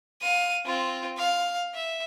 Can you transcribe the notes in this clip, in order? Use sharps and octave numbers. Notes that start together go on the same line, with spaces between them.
F5 D#7
C4 F4
F5
E5